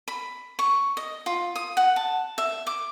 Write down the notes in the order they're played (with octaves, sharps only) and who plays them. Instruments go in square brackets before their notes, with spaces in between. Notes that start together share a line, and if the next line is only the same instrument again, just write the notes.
[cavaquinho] B5
C#6
D#5
F4
D#6
F#5
A5
E5
D6